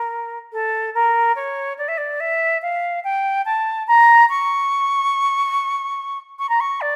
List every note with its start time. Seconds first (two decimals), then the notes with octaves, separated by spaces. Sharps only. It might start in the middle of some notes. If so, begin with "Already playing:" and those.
Already playing: A#4
0.52 A4
0.94 A#4
1.35 C#5
1.78 D5
1.88 E5
1.97 D5
2.20 E5
2.62 F5
3.04 G5
3.45 A5
3.87 A#5
4.29 C#6
6.38 C#6
6.49 A#5
6.60 C#6
6.81 D5